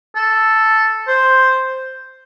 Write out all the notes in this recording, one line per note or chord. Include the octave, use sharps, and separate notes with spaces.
A4
C5